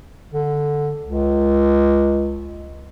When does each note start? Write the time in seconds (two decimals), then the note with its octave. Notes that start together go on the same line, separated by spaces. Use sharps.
0.32 D3
1.04 C#2